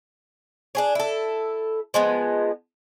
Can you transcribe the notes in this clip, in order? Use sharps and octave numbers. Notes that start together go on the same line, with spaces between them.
D4 G#4 C#5
E4 A4
F3 G#3 B3